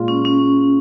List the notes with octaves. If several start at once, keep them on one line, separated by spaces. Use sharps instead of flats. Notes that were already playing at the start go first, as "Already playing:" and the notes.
Already playing: A#2 G#3 F4
C#4
C#4